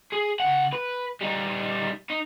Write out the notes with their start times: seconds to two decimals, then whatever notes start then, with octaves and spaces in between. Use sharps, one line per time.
0.13 G#4
0.40 C#3 F#5
0.73 B4
1.21 G3 D#4
2.10 D#4